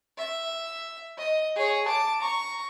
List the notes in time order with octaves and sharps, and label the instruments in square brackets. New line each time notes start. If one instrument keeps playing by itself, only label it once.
[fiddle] E5
D#5
G#4 C#5
A5 D6
A#5 C#6